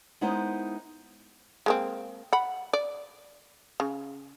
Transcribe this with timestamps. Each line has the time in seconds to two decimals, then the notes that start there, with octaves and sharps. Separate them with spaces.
0.21 G#3 B3 D#4 E4 A#4 C5
1.66 G#3 A#3 C4
2.33 F#5 B5
2.73 D5
3.80 C#3